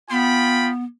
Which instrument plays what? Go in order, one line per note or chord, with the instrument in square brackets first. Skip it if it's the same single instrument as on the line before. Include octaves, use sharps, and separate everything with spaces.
[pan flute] B3 [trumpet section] F4 G5 B5